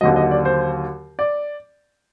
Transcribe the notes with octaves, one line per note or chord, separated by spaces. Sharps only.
D#2 D3 F#3 D#5
D#5
D5
C5
D5